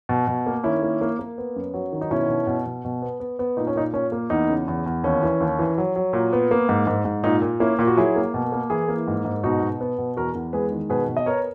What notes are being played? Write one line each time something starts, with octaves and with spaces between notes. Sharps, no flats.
B2
B2
A#3
D#3 C#4 E4
A#3
A#3
A#3
B3
F#2
F#3
D#3
D#4
B2 C#4 E4
B2
B2
B2
B2
B3
B3
B3
A#2 D#4
C#4
A#2 D#4
A#2 C#4
A#3
E2 D#4
C#3
E2
E2
D#2 C#4
E3
D#2
E3
F#3
F#3
A#2
B3
A#3
G#2
G#2
G#2
A#2 D#4
A#2
A#3 C#4 E4
A#2
F#4
F#3 E4 G#4
A#3
B2
A#3
E3 E4 G#4
A#3
G#2
G#2
B2 D#4 F#4
B2
B3
B2
E2 F#4 A#4
E2
G#3 G#4 B4
D#3
B2 G#4 B4
B2
D#5
B3 A#4 C#5